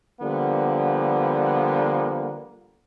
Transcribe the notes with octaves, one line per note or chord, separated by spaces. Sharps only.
D3 F3 G3 A#3 B3